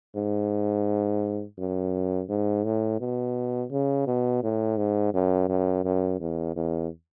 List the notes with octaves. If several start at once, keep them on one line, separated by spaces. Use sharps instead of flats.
G#2
F#2
G#2
A2
B2
C#3
B2
A2
G#2
F#2
F#2
F#2
E2
E2